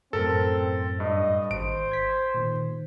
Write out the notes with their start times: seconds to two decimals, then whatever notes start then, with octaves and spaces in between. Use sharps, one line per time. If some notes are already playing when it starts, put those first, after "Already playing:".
0.13 F#2 A2 C4 A4 A#4
1.00 G2 D#5
1.51 G#1 C5 D7
1.92 G#6 B6
2.35 A#2 D#3